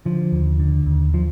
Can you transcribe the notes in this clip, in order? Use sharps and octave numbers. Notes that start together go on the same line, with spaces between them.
D3 F3
D#2
D3
D#2
F3